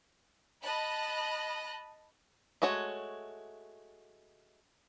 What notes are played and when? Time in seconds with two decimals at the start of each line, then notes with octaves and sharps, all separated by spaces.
0.62 D#5 A5 B5 F#6
2.62 G#3 A3 F#4 C#5